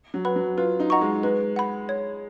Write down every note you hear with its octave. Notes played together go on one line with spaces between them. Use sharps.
F#3
B4 F#5 B5
F#3
F4 B4
D#4
D#5 F#5 A#5 C#6
G#3
G#3 B4
F#5 B5
C#5